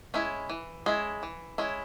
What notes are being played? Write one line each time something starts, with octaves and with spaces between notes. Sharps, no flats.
G#3 C#4 E4
E3
G#3 C#4 E4
E3
G#3 C#4 E4